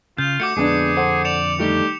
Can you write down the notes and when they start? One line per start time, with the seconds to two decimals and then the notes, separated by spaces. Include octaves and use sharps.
0.18 C#3 F4 G6
0.40 A3 F#4 D6 G6 C#7
0.57 F2 D3 G#3 B3 D4 G#4
0.96 A4 C5 F#5
1.25 D5 C#7 E7 F7
1.59 D#3 G3 A3 G4